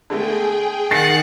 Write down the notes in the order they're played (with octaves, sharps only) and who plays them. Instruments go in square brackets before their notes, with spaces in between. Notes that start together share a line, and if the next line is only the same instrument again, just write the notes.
[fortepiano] D3 G#3 A3 [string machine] G#4 G5
[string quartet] D#3 F#5 [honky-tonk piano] A6 C7 C#7